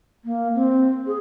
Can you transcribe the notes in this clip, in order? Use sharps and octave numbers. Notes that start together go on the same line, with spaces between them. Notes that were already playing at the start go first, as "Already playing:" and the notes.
A#3
C4
G#4